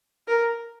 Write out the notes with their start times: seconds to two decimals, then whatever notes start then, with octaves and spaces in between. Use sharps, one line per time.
0.28 A#4